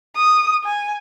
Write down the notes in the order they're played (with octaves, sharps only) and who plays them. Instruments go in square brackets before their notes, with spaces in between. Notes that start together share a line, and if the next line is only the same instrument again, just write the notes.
[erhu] D#6
G#5